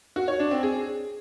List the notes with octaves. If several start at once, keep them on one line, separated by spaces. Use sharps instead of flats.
F#4
C#5
D4
C4
G#4